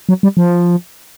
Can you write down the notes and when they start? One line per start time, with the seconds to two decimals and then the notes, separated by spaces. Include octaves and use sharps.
0.09 F#3
0.23 G3
0.37 F3